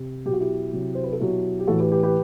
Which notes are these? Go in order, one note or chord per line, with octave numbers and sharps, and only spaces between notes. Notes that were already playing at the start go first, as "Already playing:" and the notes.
Already playing: C3
B2 F#3 G4
F#4
E4 G4
C3 F#3
C5
B4
A4
B2 F#3 E4 G4
G4
A2 E3 F#4 A4
G4 B4
G4 B4
G4 B4